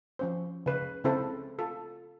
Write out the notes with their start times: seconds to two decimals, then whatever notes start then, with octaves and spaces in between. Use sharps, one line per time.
0.19 F3 C#4 C5
0.66 C#3 B4
1.04 C#3 C4 E4 A4 C5
1.59 F4 A4